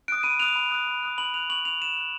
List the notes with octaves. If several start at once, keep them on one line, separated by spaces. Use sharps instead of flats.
D#6 F#6 D7
B5 D#7
D#6 F#6 F7
B5
D#6 F#6
B5
D#6 F#6
B5 F#7
D#6 F#6 F7
C#6 F#7
F#6 F7
C#6 E7
F#6